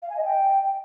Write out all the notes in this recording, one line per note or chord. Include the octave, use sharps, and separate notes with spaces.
F5
G#5
D#5
G5